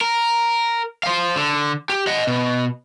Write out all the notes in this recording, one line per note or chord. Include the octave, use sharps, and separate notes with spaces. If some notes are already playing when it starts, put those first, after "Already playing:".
A#4
C5 F5
D3
G4
D#5 F#5
B2